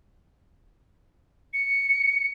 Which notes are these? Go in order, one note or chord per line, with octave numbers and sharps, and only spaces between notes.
C#7